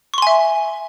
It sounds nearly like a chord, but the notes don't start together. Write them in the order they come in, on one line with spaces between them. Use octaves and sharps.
C#6 C6 G#5 E5